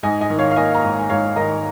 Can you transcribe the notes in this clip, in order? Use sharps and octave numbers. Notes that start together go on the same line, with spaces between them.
G#2 D#5 G#5
D#5 G#5
D#3
C#5 F5
F5
A#3 D#5 G#5
F5 A#5
G#1
G#5
G#2 C#5 F5
D#3 A#4 D#5